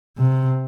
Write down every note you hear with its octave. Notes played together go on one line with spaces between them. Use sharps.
C3